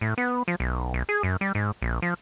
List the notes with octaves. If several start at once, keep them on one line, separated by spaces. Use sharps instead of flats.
A2
B3
F3
B1
B1
G#4
F#2
G3
G#2
A#1
F3